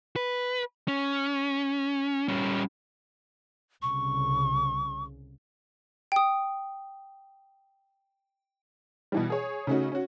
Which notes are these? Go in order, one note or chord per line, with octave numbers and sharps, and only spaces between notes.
B4
C#4
G3 C#4
C2 C#3 C#6
G5 D#6
B2 E3 G3
G#4 C#5
C#3 A3 C#4 D#4 F#4
C#4 F#4